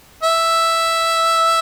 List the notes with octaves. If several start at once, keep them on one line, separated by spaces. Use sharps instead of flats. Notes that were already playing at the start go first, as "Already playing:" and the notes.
E5